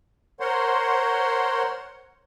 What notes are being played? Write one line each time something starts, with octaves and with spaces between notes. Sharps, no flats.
A#4 C5 C#5 F#5 C6